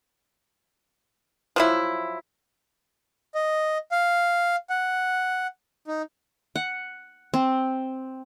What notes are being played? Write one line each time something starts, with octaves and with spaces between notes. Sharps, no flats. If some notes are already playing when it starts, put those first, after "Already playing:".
F3 F#3 E4
D#5
F5
F#5
D#4
F#5
C4